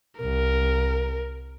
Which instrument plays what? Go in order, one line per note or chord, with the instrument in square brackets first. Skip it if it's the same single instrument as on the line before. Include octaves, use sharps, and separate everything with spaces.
[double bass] C2 [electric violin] A#4